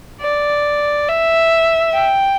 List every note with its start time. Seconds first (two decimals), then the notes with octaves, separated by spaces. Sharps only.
0.21 D5
1.08 E5
1.94 G5